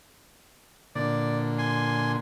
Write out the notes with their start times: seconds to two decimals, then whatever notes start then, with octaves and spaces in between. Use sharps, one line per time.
0.95 A#2 D3 D5
1.58 G#5 C6